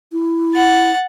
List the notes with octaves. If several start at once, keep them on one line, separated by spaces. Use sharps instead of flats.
E4
F#5 A6